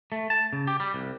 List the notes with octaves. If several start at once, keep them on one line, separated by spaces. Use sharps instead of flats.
A3
A5
C#3
G4
G3
C2